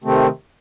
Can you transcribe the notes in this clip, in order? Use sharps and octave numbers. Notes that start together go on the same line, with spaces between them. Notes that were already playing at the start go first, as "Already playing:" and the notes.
C3 D#3 A3 C4